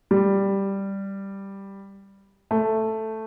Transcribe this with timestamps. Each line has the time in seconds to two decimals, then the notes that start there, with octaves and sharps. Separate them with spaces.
0.11 G3
2.51 A3